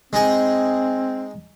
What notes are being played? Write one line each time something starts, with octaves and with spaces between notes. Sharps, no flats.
G#3 C4 D#4 G#4